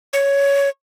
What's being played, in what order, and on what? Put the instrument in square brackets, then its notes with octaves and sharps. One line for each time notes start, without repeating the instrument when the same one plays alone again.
[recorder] C#5